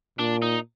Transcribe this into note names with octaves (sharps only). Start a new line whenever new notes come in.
A#2 D4
D#4